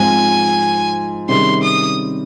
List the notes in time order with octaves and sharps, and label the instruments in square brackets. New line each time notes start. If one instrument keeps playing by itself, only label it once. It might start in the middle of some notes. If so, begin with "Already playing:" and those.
Already playing: [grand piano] G#2 F3 C4 F4 [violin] G#5
[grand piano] C3 D#3 G3 C#4 G#4 [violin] C6
[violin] D#6